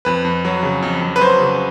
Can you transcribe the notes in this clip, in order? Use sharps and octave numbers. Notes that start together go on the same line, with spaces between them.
F2 B4
F2
F#3
C#3
F2
F2
B4
F#3 C5
C#3